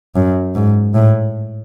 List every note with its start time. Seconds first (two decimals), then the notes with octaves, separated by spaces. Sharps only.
0.16 F#2
0.55 G#2
0.95 A2